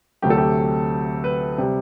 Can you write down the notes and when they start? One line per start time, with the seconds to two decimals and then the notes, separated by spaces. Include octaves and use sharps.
0.22 D2 C3 F#3 A3 G4
0.30 A4
0.37 G4
1.24 B4
1.58 C3 G3